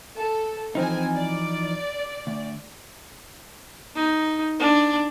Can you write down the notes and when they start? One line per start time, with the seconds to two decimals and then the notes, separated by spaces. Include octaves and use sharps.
0.17 A4
0.75 E3 F3 C4 D#4 G#5
1.14 D5
2.27 D2
3.95 D#4
4.59 D4